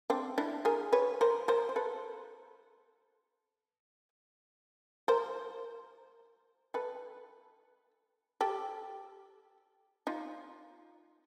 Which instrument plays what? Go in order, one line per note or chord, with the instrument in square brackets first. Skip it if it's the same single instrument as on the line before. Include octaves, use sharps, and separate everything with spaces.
[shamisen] C4 D4
D4 E4
G#4 A#4
B4 C#5
A#4 C5
A#4 C5
C5
A4 B4
A#4 C5
A4 B4
G4 A4
D#4 F4